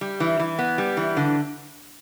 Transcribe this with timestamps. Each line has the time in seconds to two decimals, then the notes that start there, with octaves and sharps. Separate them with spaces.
0.01 G3
0.20 E3
0.39 E3
0.59 B3
0.78 G3
0.97 E3
1.17 D3